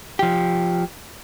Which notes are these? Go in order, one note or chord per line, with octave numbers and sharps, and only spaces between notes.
F3 G4